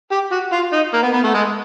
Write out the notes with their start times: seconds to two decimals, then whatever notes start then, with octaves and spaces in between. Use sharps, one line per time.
0.11 G4
0.32 F#4
0.52 F4
0.73 D#4
0.94 A#3
1.03 B3
1.14 B3
1.24 A3
1.34 G#3